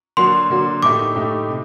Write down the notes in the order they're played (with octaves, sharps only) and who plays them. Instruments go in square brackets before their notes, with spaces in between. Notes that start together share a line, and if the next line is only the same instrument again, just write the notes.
[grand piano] D3 F#3 A#3 D4 F#4 [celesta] C6
[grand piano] D3 F#3 A#3 D4 F#4
[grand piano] A2 A3 D#4 G4 [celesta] D6
[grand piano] A2 A3 D#4 G4
C3